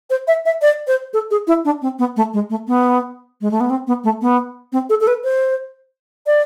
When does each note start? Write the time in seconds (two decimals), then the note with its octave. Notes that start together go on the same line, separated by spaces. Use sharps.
0.10 C5
0.27 E5
0.45 E5
0.62 D5
0.87 C5
1.13 A4
1.31 G#4
1.47 E4
1.65 D4
1.82 C4
1.99 B3
2.16 A3
2.33 G#3
2.50 A3
2.67 B3
3.41 G#3
3.51 A3
3.60 B3
3.70 C4
3.87 B3
4.04 A3
4.21 B3
4.72 C4
4.89 A4
5.01 A4
5.07 B4
5.24 C5
6.26 D5